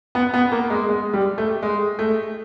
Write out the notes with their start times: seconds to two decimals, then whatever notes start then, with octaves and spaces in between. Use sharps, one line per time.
0.15 B3
0.34 B3
0.52 A#3
0.70 G#3
0.89 G#3
1.13 G3
1.38 A3
1.62 G#3
1.99 A3